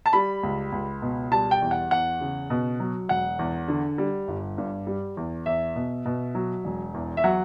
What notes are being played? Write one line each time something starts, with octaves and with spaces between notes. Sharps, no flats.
A5
G3 B5
C#2
C#2
B2
G3 A5
G5
E2
F#5
E2 F#5
C#3
B2
F#3
E1 F#5
E2
D3
G3
G1
G2
G3
E2
E2 E5
B2
B2
F#3
E1
E2
E5
F#3 F#5